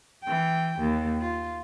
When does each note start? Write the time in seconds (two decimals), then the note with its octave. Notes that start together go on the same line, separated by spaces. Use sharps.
0.24 E3 G5
0.79 D#2
1.21 F4